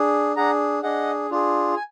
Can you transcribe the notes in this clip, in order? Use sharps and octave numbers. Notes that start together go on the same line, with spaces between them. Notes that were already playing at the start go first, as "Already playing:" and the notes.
Already playing: D4 G#4
D4 G#4 F#5 A#5
D4 G#4 D#5 F#5
D4 F4 G#4
G#5